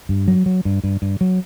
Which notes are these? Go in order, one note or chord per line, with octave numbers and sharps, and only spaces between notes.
G2
F#3
F#3
G2
G2
G2
F#3